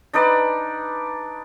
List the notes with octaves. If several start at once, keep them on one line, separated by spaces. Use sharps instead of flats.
D4 D#4 B4 D5